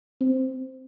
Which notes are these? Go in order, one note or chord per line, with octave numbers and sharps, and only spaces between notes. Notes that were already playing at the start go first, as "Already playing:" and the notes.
C4